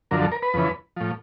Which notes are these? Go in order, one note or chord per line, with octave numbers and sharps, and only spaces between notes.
F#2 D3 F3 A#4
A4
A#4
B4
F2 C#3 E3
A2 F3